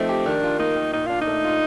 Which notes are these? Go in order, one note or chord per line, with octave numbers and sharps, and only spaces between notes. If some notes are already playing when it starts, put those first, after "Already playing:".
Already playing: F3 A3 C4 D#4
G4
D#3 D4
F4
A#3 D#4
D#3
A#2 D#4
D4 F4
D#4
A3
F4